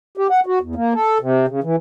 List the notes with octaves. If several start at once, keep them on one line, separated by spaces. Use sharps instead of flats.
G4
F#5
F#4
E2
A#3
A4
C3
C#3
E3